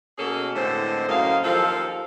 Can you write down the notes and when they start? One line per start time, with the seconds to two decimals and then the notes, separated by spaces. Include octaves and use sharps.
0.18 B2 A#3 C#4 G#4 A4
0.55 A2 D3 E3 G#3 C4 C5
1.08 F#2 A2 A#3 D#5 F5
1.44 D#2 F3 C4 A4 A#4 F5